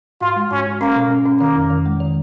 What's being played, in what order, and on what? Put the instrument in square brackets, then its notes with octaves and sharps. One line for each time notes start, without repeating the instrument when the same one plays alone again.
[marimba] G#2 [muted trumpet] F4
[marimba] G#3
[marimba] G#2 [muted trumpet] C#4
[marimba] G#2
[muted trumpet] A#3 [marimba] C#4
[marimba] B2
C#4
C#4
[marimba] D#3 [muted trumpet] A#3
[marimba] F2
D#3
G#3
D#3